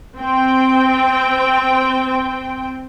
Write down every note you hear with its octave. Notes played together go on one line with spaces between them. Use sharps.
C4 G5